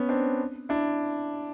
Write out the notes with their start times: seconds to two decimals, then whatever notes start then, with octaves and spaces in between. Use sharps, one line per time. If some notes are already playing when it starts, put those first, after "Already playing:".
Already playing: B3 C#4
0.09 C4 D4
0.69 D4 E4